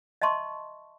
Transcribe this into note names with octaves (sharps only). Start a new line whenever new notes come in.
D#5 E5 A5 C6 C#6